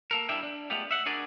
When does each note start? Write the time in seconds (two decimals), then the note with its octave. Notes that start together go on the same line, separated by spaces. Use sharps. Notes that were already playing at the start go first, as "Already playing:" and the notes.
0.11 A#3 A4 A#4
0.29 G3 D4 E4 E5 G5
0.43 D4
0.70 G#3 A3 B3 F4 G4
0.91 E5 F#5
1.06 D4 F#4 G#4 A#4 D5